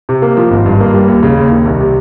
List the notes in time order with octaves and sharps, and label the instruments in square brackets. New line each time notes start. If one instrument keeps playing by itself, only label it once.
[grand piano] C3
A#3
F3
G#1
G2
A#3
G3
D#2
C#3
D#2
D#3
C2
C3